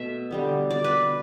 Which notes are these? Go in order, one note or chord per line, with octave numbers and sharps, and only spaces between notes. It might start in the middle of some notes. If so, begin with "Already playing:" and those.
Already playing: B2 A3 E5
D3 G3 B3
D5
B4